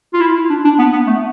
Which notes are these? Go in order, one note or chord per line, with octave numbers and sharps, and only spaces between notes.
F4
E4
D4
D4
B3
B3
A3